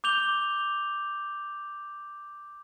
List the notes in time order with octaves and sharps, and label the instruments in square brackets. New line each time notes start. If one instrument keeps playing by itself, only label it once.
[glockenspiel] D6 G6 F7 G7